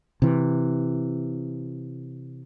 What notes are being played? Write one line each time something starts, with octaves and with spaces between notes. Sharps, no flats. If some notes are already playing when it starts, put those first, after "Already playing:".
C3 E3